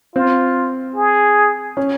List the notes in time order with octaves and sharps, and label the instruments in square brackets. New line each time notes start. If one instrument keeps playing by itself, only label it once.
[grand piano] C4 [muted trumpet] F4
[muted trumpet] G#4
[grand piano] C#4